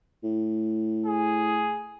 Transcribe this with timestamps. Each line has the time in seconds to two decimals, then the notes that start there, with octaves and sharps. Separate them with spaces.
0.23 A2
1.06 G#4